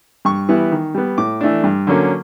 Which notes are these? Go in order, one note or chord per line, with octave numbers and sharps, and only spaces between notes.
G2 C#6
E3 G3 B3 E4
D#3
G3 B3
A2 D6
E3 A3 D4
G2
D3 F#3 A#3 C#4